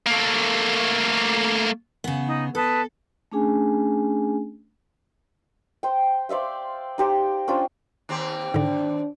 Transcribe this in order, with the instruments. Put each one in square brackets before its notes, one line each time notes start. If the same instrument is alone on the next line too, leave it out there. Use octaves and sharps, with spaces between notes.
[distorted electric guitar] A3 A#3
[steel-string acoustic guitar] C#3 B3
[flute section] D#4
[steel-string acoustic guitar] A4 [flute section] B4 A5 D#6
[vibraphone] A3 C#4 D4 G#4 G#5
[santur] C5 G5
C5 D5 E5 F5
D#4 G4 C5 D5
C#4 D4 F4 C5
[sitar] D#2 C4 G4
[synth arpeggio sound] G#2 D3 [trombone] D4